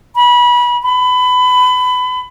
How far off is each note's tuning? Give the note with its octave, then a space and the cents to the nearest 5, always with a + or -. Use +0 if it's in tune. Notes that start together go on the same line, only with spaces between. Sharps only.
B5 -25
B5 +25